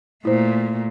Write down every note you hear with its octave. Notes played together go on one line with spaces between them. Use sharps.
A#2 A3 E4 C5